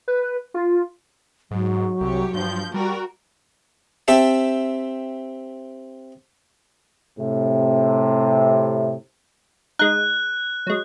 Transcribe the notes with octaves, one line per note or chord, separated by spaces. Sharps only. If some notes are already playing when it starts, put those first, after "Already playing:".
B4
F4
G#2 F#3
C2 G4 C#5
G2 F3 G6
G3 F#4 A#4
C4 G4 E5 A5
A2 C3
G#3 D#4 F#6
F#3 G#3